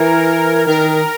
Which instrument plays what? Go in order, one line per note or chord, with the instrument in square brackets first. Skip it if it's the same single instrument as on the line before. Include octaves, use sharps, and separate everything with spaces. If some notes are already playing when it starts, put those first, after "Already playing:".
Already playing: [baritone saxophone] E3 [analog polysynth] A#4
[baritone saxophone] D#3 [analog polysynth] A#4